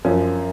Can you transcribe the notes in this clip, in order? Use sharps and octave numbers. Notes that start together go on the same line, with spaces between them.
F#2 F3 C#4